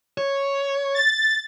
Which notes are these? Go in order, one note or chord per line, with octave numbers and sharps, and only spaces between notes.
C#5
A6